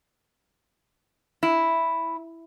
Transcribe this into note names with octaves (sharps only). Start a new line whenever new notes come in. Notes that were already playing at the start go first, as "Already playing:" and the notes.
E4